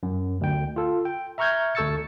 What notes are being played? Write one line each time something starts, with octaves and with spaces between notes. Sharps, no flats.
F#2
D2 G5
F4 A4
G5
E5 A#5 C#6 F6 G6 G#6
D2 A4 C#6 E6 A6 C#7